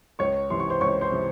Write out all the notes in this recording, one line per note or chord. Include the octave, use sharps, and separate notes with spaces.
C#2 C#5 C#6
C3 E3 C6
C#6
C5 C6
C#2 C#5 C#6
C5 C6
C3 E3